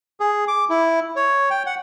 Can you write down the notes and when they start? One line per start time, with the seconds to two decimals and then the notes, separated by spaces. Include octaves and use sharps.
0.20 G#4
0.48 D6
0.69 E4
1.16 C#5
1.50 G5
1.66 F#5